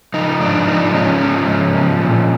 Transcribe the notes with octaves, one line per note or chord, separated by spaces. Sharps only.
F3 D#4
G#2 D4
F3 D#4
G#2 C#4
F3
G#2
F3
A#2